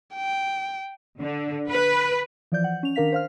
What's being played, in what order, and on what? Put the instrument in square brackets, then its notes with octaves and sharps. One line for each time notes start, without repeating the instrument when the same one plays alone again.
[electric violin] G5
[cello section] D3
B4
[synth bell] E3 F3 D5 G6
F#5
C#4 F7
D#3 D4 A#4 F5 B6 F7
C5 F5 F6